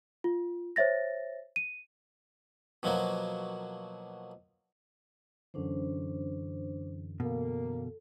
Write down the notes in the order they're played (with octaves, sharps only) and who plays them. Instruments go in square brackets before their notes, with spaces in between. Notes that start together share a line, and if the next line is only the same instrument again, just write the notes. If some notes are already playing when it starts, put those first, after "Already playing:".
[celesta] F4
C5 C#5 E5 A6 A#6
D#7
[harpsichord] B2 F3 F#3 A#3
[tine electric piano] F#2 D3 E3 [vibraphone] C#4 D4 C5
[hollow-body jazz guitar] B2 [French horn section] A#3 [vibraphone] A4